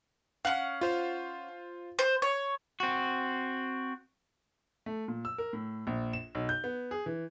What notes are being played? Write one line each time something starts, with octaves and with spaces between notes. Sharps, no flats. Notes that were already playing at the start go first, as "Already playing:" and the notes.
C#4 F5 F#5
F4 C5 F5
C5
C#5
C4 F#4
A3
A#2
E6
A#4
A2
A#1
E7
B1
G6
B3
G#4
E3